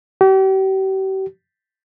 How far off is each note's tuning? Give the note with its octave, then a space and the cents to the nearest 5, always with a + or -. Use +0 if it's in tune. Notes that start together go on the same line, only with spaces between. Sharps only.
G4 -40